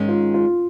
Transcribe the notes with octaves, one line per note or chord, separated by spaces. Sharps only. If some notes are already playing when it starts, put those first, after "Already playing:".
Already playing: G#2 D#3 G#3 C#4
F4
F4